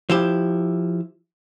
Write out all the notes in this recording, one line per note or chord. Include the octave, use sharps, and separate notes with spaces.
F3 E4 G4